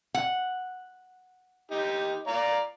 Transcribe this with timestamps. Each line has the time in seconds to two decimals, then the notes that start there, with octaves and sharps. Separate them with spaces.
0.14 F#5
1.71 D#4 G4
2.27 D5 F5 A#5